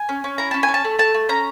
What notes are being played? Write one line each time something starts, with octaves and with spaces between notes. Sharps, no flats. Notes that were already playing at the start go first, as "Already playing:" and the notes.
Already playing: G#5
C#4
C#4
E4 A#5
C#4 A5
G#5
C#4
A5
A3
A3 A5
A3
C#4 A#5